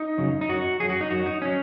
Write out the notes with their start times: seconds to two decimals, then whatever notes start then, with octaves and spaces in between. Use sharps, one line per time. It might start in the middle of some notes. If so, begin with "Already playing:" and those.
Already playing: D#4
0.18 F#2 C#3 F#3
0.41 D#4
0.49 F#2 F#3 F#4
0.80 F#2 F#3 G#4
0.90 F#4
1.01 D#4
1.10 F#2 F#3 F#4
1.26 D#4
1.42 F#3 C#4